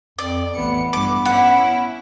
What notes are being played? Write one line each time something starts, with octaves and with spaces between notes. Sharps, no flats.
F2 D5
A1 E3 B3 C#7
G2 D6
C#4 E4 F#5